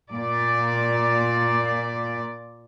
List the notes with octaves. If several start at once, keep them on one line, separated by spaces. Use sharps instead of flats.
A#2 D5